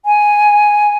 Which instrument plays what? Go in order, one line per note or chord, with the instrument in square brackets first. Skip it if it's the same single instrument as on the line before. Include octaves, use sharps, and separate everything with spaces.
[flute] G#5